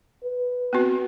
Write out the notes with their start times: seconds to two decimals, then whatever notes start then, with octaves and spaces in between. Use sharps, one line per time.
0.24 B4
0.73 B3 C4 F#4